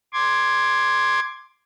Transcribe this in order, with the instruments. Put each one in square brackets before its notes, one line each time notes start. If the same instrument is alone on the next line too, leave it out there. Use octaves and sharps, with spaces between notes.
[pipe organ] C6 D6 G#6